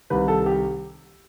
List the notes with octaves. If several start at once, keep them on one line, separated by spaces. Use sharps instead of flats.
C2 C3 D#3 B4
A4
G4